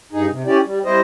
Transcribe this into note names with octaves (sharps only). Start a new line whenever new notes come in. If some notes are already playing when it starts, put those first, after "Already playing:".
G2 D#4 G#4
C3
C#4 E4 G4 D5
G3
G3 C4 E4 C5 D#5